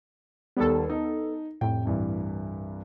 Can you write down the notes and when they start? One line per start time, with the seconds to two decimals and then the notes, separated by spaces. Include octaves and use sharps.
0.57 D#2 G3 B3 A4
0.90 D#4
1.61 F1 A2 G5
1.85 C2 G2 E3